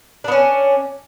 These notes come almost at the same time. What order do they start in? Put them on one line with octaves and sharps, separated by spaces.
D4 B3 C#4